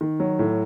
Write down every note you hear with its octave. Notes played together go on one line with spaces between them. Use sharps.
D#3
F#3
A2